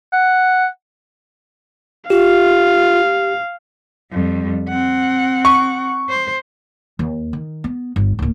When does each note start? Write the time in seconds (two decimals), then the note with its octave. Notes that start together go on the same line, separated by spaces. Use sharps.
0.13 F#5
2.10 F4 G4 F5
4.12 F2 G3
4.69 C4 F#5
5.45 C#6
6.09 C5
6.99 D#2
7.33 D#3
7.64 B3
7.96 G1
8.19 D1 A#2